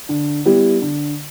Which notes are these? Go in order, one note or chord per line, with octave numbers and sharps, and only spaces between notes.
D3
G3 B3 E4 G4
D3